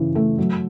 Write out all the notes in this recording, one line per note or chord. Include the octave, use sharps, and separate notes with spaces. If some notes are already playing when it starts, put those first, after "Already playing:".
Already playing: C#3 E3
A3
F#3